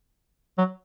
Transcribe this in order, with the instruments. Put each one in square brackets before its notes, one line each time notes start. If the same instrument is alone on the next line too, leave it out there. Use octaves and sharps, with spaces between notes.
[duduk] F#3